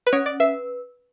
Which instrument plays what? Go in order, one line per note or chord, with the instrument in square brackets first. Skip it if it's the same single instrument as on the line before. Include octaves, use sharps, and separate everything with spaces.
[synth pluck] B4
[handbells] C#4 [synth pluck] C#5
[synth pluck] D5
[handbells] B4 [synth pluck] E5